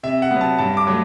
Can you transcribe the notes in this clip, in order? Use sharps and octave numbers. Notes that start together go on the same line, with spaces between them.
C3 E5
F#5
B3
F#3 A5
G2 A5
D6
F#3 A3